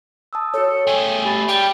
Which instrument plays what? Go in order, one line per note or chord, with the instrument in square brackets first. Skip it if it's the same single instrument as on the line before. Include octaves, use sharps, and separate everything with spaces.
[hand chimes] A5 D#6 E6
[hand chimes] F#4 C#5 [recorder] A4
[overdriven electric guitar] A3 G#4 [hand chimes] G5 [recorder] G#5
[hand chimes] G4 B5 A6
[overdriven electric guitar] G3 [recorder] G5